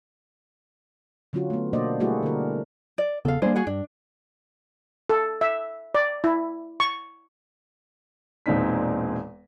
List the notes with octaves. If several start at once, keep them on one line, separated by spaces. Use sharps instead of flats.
D3 F#3 C#4 F4 F#4
A3 B3
B2 A#3 D4 C5 D5 D#5
G3 A3 A#3 E4 F#4 G#4
D3 A#4
D5
E1 C#3 B3 A4 F5
G3 A#3 D4 G#4 C5
F#4 G#4 F#5
G2 D4
A4
E5
D5
E4
C#6
E1 A#2 C4 D#4 B6